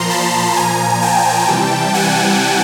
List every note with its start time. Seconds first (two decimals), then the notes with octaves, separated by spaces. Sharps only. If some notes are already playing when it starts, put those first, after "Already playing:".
Already playing: A#2 F3 A#5 C6
0.09 A5 B5
0.56 A#2 F3 G#5 A#5
1.02 G5 A5
1.48 C3 E3 G3
1.94 F#5 G#5